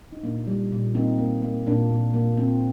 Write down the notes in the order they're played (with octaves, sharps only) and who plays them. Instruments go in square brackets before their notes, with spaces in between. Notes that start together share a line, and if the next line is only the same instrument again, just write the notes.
[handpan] D#4
A#2 A#3 D4
G3
A#2
A#3 C4 D#4
A#3
A#3
A#2 A#3 D4
A#2
A#2 A#3
A#3 C4